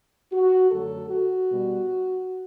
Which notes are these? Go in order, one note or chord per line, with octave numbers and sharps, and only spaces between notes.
F#4
F#2 D3 F#3 A3 A4
F#4
B2 G3